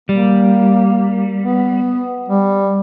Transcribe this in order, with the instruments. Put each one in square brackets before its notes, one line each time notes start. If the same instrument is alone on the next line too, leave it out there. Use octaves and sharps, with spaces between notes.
[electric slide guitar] G3 [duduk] A#3
[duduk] B3
G3